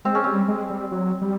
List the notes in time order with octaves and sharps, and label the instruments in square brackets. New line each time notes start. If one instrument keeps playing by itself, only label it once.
[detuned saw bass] G#3 [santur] C4
[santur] C#4
[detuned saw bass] G3 [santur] C4
[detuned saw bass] G#3
G3
F#3
G3